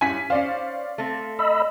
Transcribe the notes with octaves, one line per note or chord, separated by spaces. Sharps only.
G2 C#4 E4 G#5 B6
C#4 C5 D5 F5
A3 C4
D#5 B5 E6